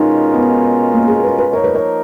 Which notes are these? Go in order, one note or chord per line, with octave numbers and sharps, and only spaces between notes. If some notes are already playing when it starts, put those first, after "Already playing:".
Already playing: B2 G#3 C#4 D#4 F4 A#4
B3
A#3
G#4
B4
B4
F3 A#3 D#4 A#4 C#5
B4
C#5